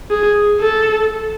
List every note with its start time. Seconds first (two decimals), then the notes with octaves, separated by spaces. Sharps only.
0.11 G#4
0.61 A4